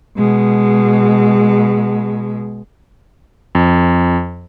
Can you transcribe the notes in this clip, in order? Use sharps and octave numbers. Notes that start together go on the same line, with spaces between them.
B2 G#3
F2